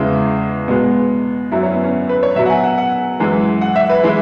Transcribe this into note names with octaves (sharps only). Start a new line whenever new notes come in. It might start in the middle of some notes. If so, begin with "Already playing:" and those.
Already playing: E2 C#3 G#3 E4
B2 G#3 B3
F#2 F#3 E4
C#4
B3
C#4
B4
C#5
B2 F#3 E5
F#5
G#5
F#5
F#5
F#2 E3 G#3
F#5
E5
B4
E3 G#3 E4